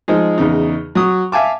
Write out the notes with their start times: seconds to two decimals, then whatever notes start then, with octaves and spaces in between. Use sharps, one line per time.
0.08 F3 G#3 D#4 G#4
0.38 E2 C#3 D#4
0.95 F#3 D#6
1.32 E5 F5 G#5 A5 D6